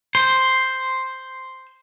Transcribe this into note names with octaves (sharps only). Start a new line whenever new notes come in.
C5